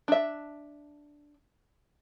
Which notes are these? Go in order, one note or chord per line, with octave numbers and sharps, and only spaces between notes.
D4 E5